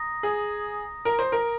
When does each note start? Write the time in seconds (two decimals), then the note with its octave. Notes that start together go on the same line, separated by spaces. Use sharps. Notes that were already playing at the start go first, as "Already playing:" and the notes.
Already playing: A#5 D#6 A#6
0.23 G#4
1.05 A#4
1.19 C5
1.32 A#4